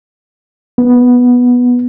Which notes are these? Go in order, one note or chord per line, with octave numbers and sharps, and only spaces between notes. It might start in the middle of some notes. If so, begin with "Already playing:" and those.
B3